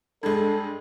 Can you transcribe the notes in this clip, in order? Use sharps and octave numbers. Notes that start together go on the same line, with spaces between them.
G2 G#3 A4